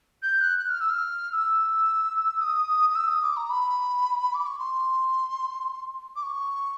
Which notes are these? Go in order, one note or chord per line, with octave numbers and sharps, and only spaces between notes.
G6
F#6
F#6
F6
E6
F6
E6
D#6
D#6
E6
D#6
D6
A#5
B5
D6
C#6
C6
D6
C#6